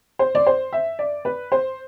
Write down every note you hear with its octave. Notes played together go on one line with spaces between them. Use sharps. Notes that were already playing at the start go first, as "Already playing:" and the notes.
C5
D5
C5
E5
D5
B4
C5